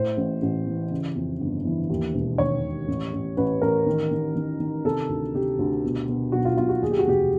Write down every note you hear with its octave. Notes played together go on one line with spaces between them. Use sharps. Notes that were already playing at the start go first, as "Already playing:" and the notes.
Already playing: A2 C5
A1
A1
E3
C#3
F2
G1
E3
D#2
E1
D#3 C#5
E1
A1
A1
A1 B4
A1 A#4
D#3
D#3
D#3
D#3
C3 A4
D2
C3 G4
D2
B2
B2
B1 F#4
F4
B1 F4
F#4
D#2 G#4
G4
F#4
F1 G4